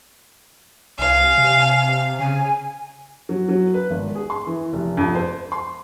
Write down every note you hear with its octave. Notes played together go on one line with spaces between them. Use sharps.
C2 F5 G#5
C3
C#3 G#5
F#3
F#3
B4
G#1
G#4
C6
E3
F1
F2
C5
C6